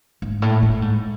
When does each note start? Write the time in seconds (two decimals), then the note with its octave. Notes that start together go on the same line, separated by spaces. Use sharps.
0.22 G#2
0.42 A2
0.62 A2
0.82 G#2